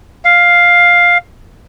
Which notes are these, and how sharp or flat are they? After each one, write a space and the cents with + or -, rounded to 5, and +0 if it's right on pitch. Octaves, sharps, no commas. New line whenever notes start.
F5 +5